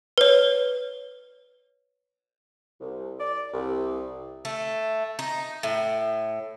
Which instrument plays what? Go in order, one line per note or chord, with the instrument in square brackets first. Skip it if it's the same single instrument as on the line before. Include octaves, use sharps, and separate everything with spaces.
[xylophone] B4 C#5
[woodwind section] C2
D5
C2
[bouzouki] A3
D#4
A2